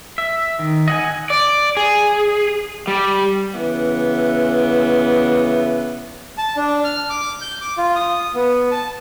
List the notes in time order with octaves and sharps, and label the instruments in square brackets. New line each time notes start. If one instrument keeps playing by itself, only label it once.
[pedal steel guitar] E5
D#3
D#5 F#5 G#5
[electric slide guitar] D5
G#4
G3
[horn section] C#3 E3 B3
[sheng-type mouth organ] A5
D4
F6
D6
G6
D6
F4
D#6
B3
A5